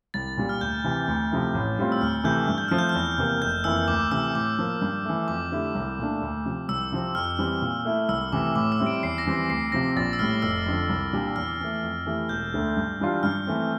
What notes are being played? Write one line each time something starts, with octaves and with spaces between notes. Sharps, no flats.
C2 A6
A#2 G3
F6
D2 G6
C3 E3
D2
C3 F3 A3 E4
A1
A2 G3 C4 F4
E6
D2 F6
C3 E3 A3 E4 G6
G2 F6
G6
F3 A3 C4 F6
G6
F6
E2
C3 E3 A#3
F1 G6
F2 E3 A#3 E4 E6
D2 D6
C3 E3 A3 E6
A2 D6
F3 A#3
G2
E3 A3
F2 D6
D3 A3 E4 G4
C2
A#2 A3 D4
D2
C3 F3
C2 E6
C3 F3 C4
F2 F6
E3 G3 C4
A#2
A3 E4
C2 E6
C3 E3 A3 D6
A2 D6
E6
G3 C4 E4
D7
E2 C7
A#6
E3 G3 C4
C7
D2 C7
C3 F3 C4 A#6
A#1 A6
E6
A2 G3 F6
F1 E6
F2 D3 F3
C2
A#2 G3 D4 G4
E2 F6
E3 A3
F2
E3 A3 E4 G4
E1 G6
D2 D3 A3
G2
E3 G3 D4 F4
G2 F6
E3 A3 C4